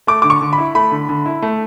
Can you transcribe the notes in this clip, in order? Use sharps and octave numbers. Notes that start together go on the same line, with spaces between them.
A3 D6
D3 D6
C#6
D3
B5
E4
A3 B5
D3
D3
E4
A3